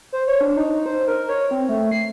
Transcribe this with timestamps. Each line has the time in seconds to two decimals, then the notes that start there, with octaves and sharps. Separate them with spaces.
0.12 C5
0.27 C#5
0.41 D4
0.57 D#4
0.86 C5
1.08 A#4
1.29 C#5
1.51 C4
1.69 A3
1.91 C7